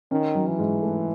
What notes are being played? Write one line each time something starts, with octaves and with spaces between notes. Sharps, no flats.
D#3 C#4
F#3
E3
G#2
A3